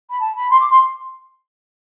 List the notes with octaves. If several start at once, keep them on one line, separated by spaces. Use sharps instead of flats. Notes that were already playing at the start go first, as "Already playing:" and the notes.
B5
A5
B5
C6
D6
C6